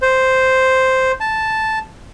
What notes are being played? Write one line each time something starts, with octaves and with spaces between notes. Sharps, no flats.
C5
A5